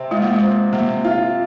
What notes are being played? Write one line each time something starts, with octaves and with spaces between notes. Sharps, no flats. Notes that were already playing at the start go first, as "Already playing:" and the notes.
Already playing: C3 C4
G#3 F4
A#3
G#3
C4
C3 A#3
F4